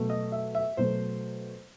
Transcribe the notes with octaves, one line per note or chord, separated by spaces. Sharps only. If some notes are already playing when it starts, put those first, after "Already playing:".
Already playing: B2 F#3 A3
D#5
E5
E5
B2 F#3 A3 C5